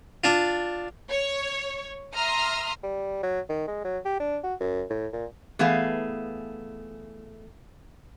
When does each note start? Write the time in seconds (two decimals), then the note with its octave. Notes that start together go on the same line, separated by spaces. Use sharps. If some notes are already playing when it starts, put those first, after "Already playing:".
0.24 D4 F4
1.10 C#5
2.15 E5 A#5 C6 D#6 F6
2.83 G3
3.23 F#3
3.50 D#3
3.67 G#3
3.84 F#3
4.05 G4
4.20 D4
4.44 F#4
4.61 F#2
4.90 A2
5.13 A#2
5.59 E3 A3 B3 G#4 F5